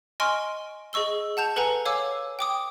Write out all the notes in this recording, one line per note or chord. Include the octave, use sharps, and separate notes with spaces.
D#5 G#5 C6 C#6 F6 D7
G#4 D#5 C#6 E6 G7
F#5 A5 G6 F7
A4 B4 F#5 G#5 A#5
C#5 F5 G#5 D6 E6
G5 D6 D#6